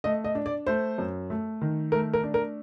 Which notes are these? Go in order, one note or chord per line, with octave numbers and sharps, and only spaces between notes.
A3 D#5
D#5
D4
D5
A3 C5
F#2
A3
D#3
A3 A#4
A#4
D4
A#4